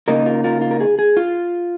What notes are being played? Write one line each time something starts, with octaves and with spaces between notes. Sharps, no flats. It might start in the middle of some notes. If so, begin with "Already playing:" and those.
C#3 A#3 D#4 A#4 D#5
F4 A#4
F4 A#4
F4
A#4
G#4
G#4
F4